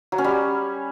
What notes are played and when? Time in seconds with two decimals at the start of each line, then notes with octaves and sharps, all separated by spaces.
0.12 F#3
0.18 C#4
0.24 G3